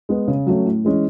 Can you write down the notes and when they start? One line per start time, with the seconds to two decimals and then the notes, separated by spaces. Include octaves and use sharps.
0.09 G#3 B3
0.28 C#3
0.47 F#3 A3 C#4
0.65 A2
0.85 E3 G#3 C#4